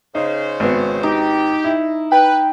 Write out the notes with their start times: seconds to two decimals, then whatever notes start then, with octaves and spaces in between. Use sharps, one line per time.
0.15 C#3 D#4 C5
0.60 G#1 B3
1.03 D#4 G4
1.64 E4
2.12 B4 G5